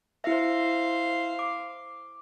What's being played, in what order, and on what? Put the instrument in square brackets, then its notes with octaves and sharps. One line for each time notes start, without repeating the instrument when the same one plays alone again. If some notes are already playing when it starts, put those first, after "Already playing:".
[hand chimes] E4 E5 [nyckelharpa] C5 F5
[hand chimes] D6